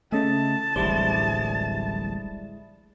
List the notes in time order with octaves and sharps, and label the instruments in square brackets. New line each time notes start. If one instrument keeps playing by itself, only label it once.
[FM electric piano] C#3 D#5 E5 [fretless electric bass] A3 [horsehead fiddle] A5
[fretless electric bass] D1 A1 [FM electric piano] G3 D5 [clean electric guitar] G#3 E4 C5